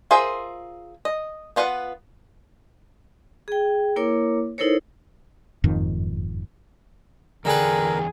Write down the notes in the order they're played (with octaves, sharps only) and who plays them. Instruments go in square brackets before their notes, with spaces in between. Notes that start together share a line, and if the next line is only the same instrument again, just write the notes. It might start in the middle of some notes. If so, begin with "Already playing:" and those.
[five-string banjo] F4 G#4 A#4 C5 E5
D#5
B3 F4 B4 F5 F#5
[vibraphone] G#4 G5
A#3 E4 A#4 C#5 D6
D#4 E4 A4 A#4 C5 C#5
[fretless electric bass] F#1 F2 G#2 D#3
[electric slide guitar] E2 D5 G5 [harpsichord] D3 B4 [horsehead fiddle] G#4 [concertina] A#4